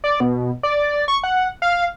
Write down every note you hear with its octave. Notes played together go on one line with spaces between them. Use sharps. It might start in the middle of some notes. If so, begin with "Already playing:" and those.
D5
B2
D5
C#6
F#5
F5